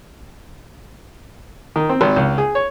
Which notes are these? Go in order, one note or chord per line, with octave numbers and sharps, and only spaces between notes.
D#3
C4
G#1
C#2
G#4
C#5